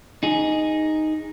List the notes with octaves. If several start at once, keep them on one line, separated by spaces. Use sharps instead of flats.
D#4 G#4